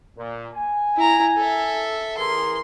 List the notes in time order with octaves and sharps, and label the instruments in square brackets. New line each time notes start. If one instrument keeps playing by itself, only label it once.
[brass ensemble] A#2
G#5
[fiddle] E4 A#5
A4 E5
[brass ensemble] E3 G#4 A#4 [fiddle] C6